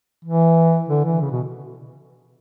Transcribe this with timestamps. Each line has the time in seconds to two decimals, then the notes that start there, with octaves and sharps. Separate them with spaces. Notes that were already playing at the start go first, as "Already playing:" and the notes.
0.24 E3
0.88 D3
1.05 E3
1.21 C#3
1.31 B2